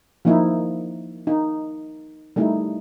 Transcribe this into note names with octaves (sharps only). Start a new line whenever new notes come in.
F3 A#3 D#4 E4
D#4
G3 A3 D#4 E4